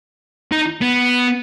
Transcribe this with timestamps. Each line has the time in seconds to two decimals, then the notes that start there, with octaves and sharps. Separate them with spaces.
0.52 D#4
0.81 B3